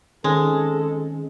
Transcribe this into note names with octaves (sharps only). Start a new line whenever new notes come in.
D#3 G#3 C4 C#4 A4